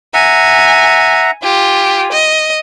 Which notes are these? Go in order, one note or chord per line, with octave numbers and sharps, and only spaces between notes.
E5 F#5 G#5 A#5
F4 G4 G#5
D#5